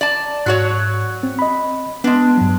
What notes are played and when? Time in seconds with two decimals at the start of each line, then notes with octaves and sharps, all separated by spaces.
0.01 D5 A5
0.46 G#2 F#3 F#4 C#5
1.23 C4
1.39 D#5 B5
2.04 G#3 B3 D4
2.38 G2 F#3